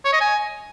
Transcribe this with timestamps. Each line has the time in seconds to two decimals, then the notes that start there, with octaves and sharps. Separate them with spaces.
0.05 C#5
0.13 D#5
0.21 G#5